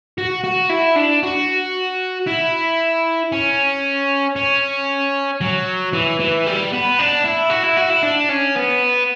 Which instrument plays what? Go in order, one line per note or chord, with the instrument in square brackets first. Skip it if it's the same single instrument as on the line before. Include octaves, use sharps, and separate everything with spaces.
[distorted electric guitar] F#4
F#4
E4
D4
F#4
E4
C#4
C#4
F#3
E3
E3
G3
B3
D4
E4
F#4
E4
F#4
E4
D4
C#4
B3